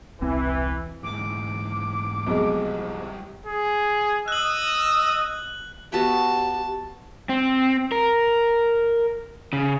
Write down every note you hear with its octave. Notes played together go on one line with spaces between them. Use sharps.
E1 C2 E3 C4
G#2 E3 D6
B1 F2 G3 G#3 C5
G#4
D#5 D#6 E6 F#6 F#7
B3 F#4 G4 E5 A5
C4
A#4
C#3